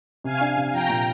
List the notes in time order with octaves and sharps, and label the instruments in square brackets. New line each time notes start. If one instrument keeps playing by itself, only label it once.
[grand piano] C3 [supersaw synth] F5 G#5
[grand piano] D4
C3
[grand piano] F3 [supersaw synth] G5 A#5
[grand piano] A#2